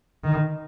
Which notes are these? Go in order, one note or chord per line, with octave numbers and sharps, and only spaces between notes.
D#3